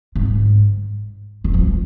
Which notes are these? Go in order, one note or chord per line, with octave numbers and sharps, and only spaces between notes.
G#2
D#3
F3